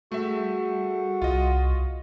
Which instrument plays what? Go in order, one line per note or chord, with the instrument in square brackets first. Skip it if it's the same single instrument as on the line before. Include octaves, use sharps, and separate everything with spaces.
[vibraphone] G3 G#4 [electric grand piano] A3 E5 [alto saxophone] F#4
[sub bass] C2 [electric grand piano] F4 D#5